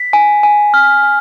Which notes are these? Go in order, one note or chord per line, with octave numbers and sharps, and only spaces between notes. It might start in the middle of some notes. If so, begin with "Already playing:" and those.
Already playing: B6
G#5
G#5
F6
G#5